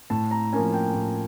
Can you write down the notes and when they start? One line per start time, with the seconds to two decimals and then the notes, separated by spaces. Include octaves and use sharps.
0.10 A2 A5
0.31 A#5
0.53 F3 A#3 C#4 G#5
0.73 G5
0.94 A2